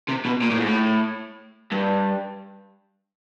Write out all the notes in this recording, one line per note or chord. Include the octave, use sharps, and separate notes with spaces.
C3
B2
A#2
A2
G#2
A2
G2